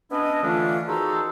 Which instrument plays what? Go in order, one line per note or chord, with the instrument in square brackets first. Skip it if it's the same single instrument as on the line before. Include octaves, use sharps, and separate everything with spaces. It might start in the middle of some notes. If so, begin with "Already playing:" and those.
[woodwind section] B3 C#4 D4 E4 D#5
D3 E3 A3 C#4 D4 F4
D#3 F#4 G#4 A4 C5 A#5